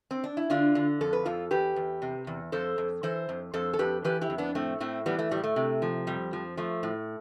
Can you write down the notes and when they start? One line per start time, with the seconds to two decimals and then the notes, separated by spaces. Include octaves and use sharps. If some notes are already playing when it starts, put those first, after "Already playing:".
0.11 C4
0.24 D4
0.37 E4
0.50 D3 D4 F4
0.75 D3
1.01 F2 A4
1.13 B4
1.25 F2 F4 A4
1.51 E2 G4 B4
1.76 E2
2.02 C3
2.27 E2
2.52 F2 A4 C5
2.78 F2
3.03 E3 A4 C5
3.29 F2
3.54 F2 A4 C5
3.74 A4
3.79 F2 G4 B4
4.04 E3 G4 B4
4.21 E4 G4
4.30 F2
4.38 B3 D4
4.55 A2 A3 C4
4.80 A2 A3 C4
5.06 E3 G3 B3
5.19 A3
5.31 A2 G3
5.44 A3
5.56 C3
5.82 F3
6.07 F2 G3
6.33 F3
6.57 F3 A3
6.83 A2